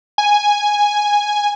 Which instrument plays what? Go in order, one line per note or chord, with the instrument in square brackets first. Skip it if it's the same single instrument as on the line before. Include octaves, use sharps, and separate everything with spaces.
[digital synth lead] G#5